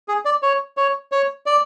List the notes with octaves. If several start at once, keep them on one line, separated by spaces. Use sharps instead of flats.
G#4
D5
C#5
C#5
C#5
D5